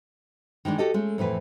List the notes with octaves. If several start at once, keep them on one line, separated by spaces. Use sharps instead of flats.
D#3 E3 G#3 D4
F#4 G4 A4 D#5
G#3 A3 C#4
F2 A2 E3 B4